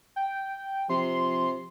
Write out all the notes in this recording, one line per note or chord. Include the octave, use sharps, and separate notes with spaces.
G5
C3 F3 C6